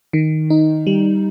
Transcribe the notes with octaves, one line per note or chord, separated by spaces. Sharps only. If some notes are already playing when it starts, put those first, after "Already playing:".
D#3
D#4
G3